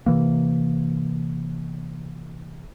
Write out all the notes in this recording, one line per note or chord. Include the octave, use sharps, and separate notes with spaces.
C3 E3 A#3